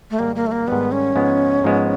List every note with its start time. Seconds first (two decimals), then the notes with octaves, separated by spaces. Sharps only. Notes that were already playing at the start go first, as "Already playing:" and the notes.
0.11 A3
0.19 G#2 D#3 G3 A#3
0.36 A#3
0.46 A3
0.52 A#3
0.68 G#2 D#3 G3 B3
0.92 C#4
1.15 G#2 F3 G#3 B3
1.64 G#2 F3 G#3 B3